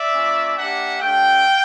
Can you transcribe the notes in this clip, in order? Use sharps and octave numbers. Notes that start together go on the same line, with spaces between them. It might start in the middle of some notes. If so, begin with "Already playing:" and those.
Already playing: D5 E5
A#3 C#4 F4
A#3 D4 G4 E5 F#5
A3 D4 G4 F5 G5